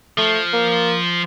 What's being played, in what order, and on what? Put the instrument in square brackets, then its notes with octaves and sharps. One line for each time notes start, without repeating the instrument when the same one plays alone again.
[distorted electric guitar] F3 [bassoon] A3
[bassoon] A#3